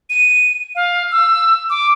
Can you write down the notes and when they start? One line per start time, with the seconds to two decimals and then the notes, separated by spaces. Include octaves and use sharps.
0.10 D#7
0.75 F5
1.11 E6
1.70 D6